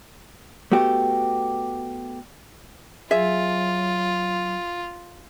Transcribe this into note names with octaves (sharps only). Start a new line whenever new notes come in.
A3 B3 F#4 G4
F#3 F4 G#4 E5